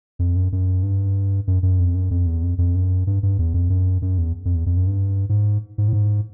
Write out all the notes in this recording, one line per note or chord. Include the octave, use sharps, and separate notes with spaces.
F2
F#2
F#2
G2
F#2
F#2
F2
F#2
F2
E2
F2
F2
F#2
G2
G2
E2
F2
F#2
F#2
E2
F2
E2
F2
F#2
G2
G#2
G#2
A2
G#2